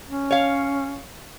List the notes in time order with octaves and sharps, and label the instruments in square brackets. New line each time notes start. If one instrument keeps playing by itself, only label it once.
[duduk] C#4
[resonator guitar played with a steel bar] C#5 F5